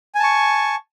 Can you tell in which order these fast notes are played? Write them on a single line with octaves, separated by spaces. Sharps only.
G#5 A5 C#6